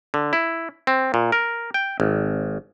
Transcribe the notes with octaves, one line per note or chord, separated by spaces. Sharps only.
D3
E4
C4
A#2
A#4
G5
G#1